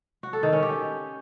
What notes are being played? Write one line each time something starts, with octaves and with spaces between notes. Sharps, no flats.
F#4
A4
D#3
C#4
G4